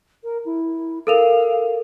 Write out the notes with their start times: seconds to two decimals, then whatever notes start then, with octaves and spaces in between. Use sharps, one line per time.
0.23 A#4
0.45 E4
1.07 A4 A#4 F5 F7